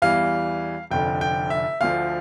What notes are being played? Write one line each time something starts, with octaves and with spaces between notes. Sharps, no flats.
E2 E3 G3 F5
F1 F2 D3 G5
G5
E5
D2 D3 F3 F5